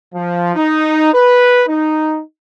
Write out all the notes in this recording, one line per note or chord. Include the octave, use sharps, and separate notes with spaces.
F3
D#4
B4
D#4